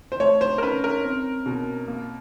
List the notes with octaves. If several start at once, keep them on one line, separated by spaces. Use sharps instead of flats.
C5
A3 C#5
C5
A#4
C#4 B4
A#4
C4
B2
A#3